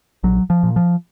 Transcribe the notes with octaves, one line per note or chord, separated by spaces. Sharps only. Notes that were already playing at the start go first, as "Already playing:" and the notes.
A#1 F#3
F3
A#2
F3